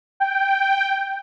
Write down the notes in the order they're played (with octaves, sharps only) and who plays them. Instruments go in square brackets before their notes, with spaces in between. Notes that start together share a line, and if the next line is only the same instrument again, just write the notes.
[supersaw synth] G5